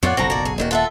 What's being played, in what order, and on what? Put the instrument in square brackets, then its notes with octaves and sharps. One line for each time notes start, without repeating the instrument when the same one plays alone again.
[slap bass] F2 B3 [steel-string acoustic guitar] A2 F4 [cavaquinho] C#5 D5 F#5
[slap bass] F#1 B1 A#2 [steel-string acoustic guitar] C4 F#5 [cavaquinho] F#4 A4 A#5
[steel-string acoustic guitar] A#3 D5
G#4
[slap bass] D#1 A#3 [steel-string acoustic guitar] E2 D#3 F#4
[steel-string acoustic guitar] F4 A4 E5 [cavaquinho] F#5 A5